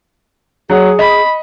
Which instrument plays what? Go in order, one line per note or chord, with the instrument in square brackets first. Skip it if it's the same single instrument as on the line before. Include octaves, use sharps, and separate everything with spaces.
[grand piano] F#3 F#5 [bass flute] G#4
[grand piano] D#5 [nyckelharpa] B5